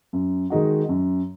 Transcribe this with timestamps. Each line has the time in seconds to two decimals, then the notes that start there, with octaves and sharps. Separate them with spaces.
0.13 F#2
0.50 D#3 G#3 D#4 F#4
0.89 F#2